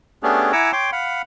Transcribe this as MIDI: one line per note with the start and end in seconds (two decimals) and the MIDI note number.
0.23 0.52 57
0.23 0.52 59
0.23 0.52 61
0.23 0.52 62
0.23 0.52 67
0.23 0.52 68
0.53 0.72 64
0.53 0.72 78
0.53 0.72 80
0.53 0.72 82
0.53 0.72 86
0.53 0.72 88
0.72 0.91 73
0.72 0.91 79
0.72 0.91 84
0.72 0.91 86
0.92 1.22 77
0.92 1.22 78
0.92 1.22 83